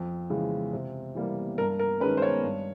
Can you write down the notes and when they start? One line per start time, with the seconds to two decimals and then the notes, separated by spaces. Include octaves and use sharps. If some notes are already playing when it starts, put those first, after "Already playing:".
Already playing: F2
0.30 C#3 E3 G#3
0.73 C3
1.15 E3 G3 A#3
1.58 G2 A#4
1.79 A#4
2.00 D#3 G#3 C#4 B4
2.17 C5
2.22 C#5
2.44 G2